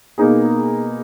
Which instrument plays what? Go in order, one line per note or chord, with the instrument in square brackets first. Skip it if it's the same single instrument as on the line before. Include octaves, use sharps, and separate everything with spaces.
[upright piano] B2 A#3 D#4 G#4